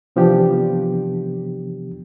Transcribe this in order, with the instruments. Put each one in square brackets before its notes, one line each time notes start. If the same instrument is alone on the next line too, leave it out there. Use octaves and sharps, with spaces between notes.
[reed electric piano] C3 E3 F3 B3 D4 G4